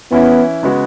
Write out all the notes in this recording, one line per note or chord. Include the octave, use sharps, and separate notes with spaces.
E3 B3 C#4 E4
C#3 G#3 B3 F#4